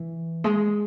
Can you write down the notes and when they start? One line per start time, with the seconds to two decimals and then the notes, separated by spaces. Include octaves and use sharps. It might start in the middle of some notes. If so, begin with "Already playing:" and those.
Already playing: E3
0.44 G#3